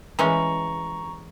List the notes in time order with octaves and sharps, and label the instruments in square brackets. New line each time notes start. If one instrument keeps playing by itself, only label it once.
[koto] E3 G#3 C#4 [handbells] A#5 C#6